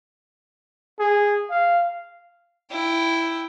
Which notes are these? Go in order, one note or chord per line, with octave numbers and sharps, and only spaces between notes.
G#4
F5
E4 G5